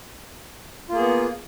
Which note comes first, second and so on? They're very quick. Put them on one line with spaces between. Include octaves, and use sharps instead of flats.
F4 A#3 G#4 B3